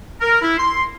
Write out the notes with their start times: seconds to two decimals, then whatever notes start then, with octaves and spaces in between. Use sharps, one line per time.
0.21 A#4
0.42 E4
0.58 C6